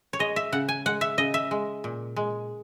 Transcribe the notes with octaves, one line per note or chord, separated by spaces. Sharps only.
C#5
G#3 D#5
E5
C#3 F#5
G#5
G#3 F#5
E5
C#3 D#5
E5
G#3
A#2
G#3